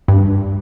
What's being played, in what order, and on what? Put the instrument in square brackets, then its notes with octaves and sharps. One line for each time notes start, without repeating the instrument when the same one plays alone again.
[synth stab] G2